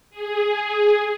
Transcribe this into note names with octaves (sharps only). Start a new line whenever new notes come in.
G#4